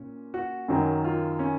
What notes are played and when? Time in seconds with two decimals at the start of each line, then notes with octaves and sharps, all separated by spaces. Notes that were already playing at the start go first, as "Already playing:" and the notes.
Already playing: A#2 C#4
0.34 F#4
0.68 F#2 D#3 F#3 C#4 F#4
1.04 F4
1.39 C#4